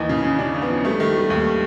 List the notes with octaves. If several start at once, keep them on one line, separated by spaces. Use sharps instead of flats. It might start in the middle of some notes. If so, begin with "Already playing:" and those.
Already playing: D#2 E3 D#4
C#3
C#3
C#3 D4
C#3
B3
F3
G3 A3
D#3 A3
G3
D#2